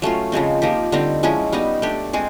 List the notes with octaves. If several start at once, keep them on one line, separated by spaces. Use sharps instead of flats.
F#3 A3 C#4 F4
C#3 F3 G#3 C4
F3 A#3 D#4 G4
D3 G3 C4 D#4
F3 G#3 C#4 E4
G3 B3 D#4
A3 D4 G4
G#3 C4 G#4